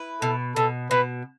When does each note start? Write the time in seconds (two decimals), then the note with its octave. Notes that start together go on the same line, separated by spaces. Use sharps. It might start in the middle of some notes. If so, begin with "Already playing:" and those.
Already playing: E4 B4
0.22 B2 A4
0.56 B2 A4
0.91 B2 B4